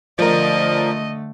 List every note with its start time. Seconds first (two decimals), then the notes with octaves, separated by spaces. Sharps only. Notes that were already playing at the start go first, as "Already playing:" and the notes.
0.19 D3 F3 A3 A#4 D5 D#5